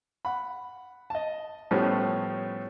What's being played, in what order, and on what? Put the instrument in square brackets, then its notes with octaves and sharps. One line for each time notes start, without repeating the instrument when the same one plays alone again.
[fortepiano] F#5 B5
D#5 A5
A2 F3 G3 A3 B3 C#4